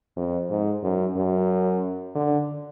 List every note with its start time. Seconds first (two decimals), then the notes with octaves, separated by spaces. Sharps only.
0.17 F2
0.50 G#2
0.83 F#2
1.16 F#2
2.15 D3